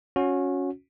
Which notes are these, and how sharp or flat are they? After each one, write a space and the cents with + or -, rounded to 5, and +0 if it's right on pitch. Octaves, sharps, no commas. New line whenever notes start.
C#4 +0 F#4 -25